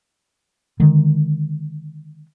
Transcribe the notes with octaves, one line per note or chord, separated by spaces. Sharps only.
D3 D#3 G#3